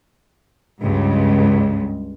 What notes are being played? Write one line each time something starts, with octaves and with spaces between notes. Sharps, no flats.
C#2 G2